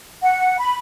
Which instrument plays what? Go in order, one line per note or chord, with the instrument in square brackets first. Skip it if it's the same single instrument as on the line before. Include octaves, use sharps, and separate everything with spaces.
[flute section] F#5
B5